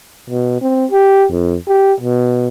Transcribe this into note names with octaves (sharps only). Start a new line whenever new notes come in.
B2
C4
G4
F2
G4
B2